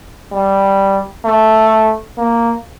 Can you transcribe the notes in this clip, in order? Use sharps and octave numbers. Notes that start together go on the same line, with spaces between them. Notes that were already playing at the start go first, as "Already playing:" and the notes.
G3
A3
A#3